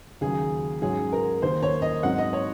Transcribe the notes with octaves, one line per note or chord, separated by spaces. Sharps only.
D#2 C#3 F#3 G#4
G#2 F#3 C#4 G#4
A#4
D#2 D#3 A#3 D#4 C5
C#5
D#5
G#2 F#3 C4 D#4 F#5
D#5
C#5